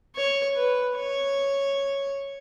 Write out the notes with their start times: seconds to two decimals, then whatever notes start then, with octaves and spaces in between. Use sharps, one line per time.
0.16 C#5
0.56 B4
0.96 C#5